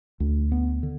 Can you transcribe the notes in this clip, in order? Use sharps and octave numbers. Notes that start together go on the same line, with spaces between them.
D2
B3
D3